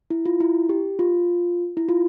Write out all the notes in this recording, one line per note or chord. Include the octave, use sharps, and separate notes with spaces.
E4
F4
E4
G4
F4
E4
F4